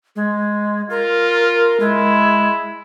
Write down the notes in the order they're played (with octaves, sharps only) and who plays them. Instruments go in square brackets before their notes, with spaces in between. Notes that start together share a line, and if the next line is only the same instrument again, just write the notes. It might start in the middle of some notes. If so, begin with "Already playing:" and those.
[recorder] G#3
[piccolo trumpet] F4 [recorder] A#4
[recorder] G#3 [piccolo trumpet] E4